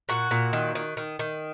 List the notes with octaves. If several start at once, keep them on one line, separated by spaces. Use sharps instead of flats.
A#2 F#4
A#2
D#3
D#3
D#3
D#3